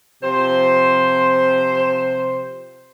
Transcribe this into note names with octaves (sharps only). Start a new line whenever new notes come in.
C3 F3 C5